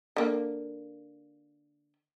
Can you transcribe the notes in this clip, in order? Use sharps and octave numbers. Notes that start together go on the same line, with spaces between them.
D3 A#3